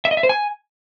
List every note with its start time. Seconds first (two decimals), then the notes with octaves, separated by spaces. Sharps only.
0.05 E5
0.11 D#5
0.17 E5
0.23 C5
0.29 G#5